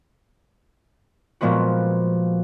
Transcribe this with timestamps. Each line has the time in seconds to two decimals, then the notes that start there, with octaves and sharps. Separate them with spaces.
1.41 A#2 F3 G#3 B3 F#4